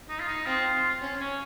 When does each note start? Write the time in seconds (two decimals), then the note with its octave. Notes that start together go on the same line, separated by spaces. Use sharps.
0.09 D#4
0.20 F4
0.28 D#4
0.46 C4 F4
1.01 C#4
1.20 C#4